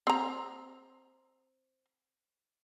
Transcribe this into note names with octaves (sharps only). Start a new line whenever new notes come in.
C4 A#5